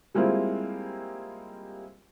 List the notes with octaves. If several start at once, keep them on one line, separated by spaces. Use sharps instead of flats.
G3 G#3 A#3 C4 E4 F4